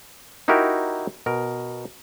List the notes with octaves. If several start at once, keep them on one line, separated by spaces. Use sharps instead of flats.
D#4 E4 F#4 G4 A#4
B2 A#4